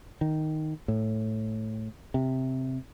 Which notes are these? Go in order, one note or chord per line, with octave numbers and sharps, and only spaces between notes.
D#3
A2
C3